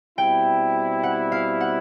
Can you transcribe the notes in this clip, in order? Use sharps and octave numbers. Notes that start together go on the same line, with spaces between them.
B2 G3 C4 E4 G5
F#5
F5
F#5